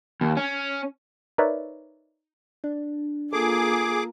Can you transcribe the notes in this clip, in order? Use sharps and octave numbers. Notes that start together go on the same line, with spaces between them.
D#2
C#4
D#4 A#4 B4 C#5 D5 E5
D4
A#3 F4 G#4 A4 D6